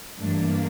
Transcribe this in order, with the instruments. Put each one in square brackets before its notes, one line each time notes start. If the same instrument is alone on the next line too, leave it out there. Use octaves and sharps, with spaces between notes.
[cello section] G2 E3 A3 D4 [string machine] A#3